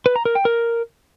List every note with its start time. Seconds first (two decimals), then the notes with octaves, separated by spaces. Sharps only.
0.06 B4
0.16 A#5
0.25 A#4
0.35 G5
0.45 A#4